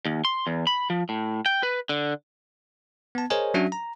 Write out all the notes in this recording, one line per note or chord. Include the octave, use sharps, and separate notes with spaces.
D#2
C6
E2
B5
F3
A2
G5
B4
D3
B3 A5
G#4 A#4 C5 C#5 D#5 G#5
F#3 C#4 D4 F#4 E5
A#5